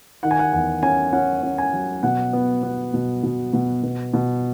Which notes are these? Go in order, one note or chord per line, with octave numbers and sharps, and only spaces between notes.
D#3 F#5
G#5
F#5
E2 F#5
C#4 G#5
C#4 F#5
C#4
G#5
F#3
B2 F#5
B3
B3
B2
B2
B2
B2
B2